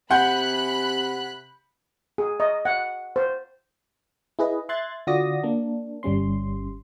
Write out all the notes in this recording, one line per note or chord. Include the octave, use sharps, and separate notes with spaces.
C3 F#5 G#5 B5 C6 F#6 G6
G#4
D#5
F#5
C5
E4 G#4 B4 D#5
E5 C6 F#6 G#6 A6
D3 F4 F#4 D5 D#6 A#6
A#3 D4
G1 G3 C#4 C6